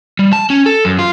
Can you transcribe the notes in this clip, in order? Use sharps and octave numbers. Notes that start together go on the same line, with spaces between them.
G3
A5
C#4
A4
F#2
F4